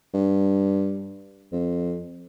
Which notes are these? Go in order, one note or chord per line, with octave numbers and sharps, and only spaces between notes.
G2
F2